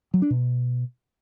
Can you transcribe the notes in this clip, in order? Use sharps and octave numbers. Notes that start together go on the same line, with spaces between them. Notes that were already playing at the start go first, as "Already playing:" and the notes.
F#3
D4
B2